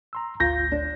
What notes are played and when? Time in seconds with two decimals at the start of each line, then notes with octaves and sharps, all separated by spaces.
0.13 A#5 C6 E6
0.40 G#1 D2 F4 G6 A#6
0.72 D4